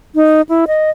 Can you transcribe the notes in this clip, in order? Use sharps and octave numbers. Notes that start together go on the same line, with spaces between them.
D#4
E4
D#5